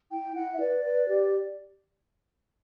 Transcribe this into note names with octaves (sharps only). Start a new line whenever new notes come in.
E4 G5
E4 F#5
E5
B4 D5
B4
G4